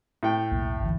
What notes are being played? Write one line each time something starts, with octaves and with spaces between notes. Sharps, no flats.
A2 G5
B1 E2 A#3
G#1 D2 E3